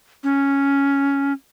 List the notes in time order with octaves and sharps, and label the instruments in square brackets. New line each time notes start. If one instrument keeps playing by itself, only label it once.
[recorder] C#4